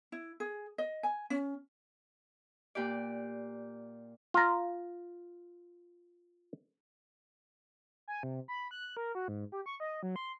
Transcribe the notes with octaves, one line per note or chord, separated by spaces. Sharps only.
E4
G#4
D#5
G#5
C#4
A#2 G4 D5
F4 A#5
G#5
C3
B5
F#6
A#4
F#4
G#2
G4
C#6
D#5
F#3
C6